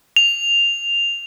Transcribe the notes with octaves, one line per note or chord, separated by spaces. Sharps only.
F7